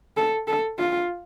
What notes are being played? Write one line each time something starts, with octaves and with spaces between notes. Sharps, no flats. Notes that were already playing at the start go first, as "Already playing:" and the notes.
A4
A4
F4